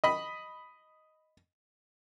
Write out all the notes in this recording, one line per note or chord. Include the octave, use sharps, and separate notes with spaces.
D#5 B5